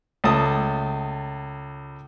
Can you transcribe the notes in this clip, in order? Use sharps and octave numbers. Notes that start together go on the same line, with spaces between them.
C#2 A3 A5 D#6